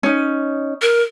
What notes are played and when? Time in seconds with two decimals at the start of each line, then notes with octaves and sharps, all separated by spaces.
0.03 C#4 D#4
0.82 A#4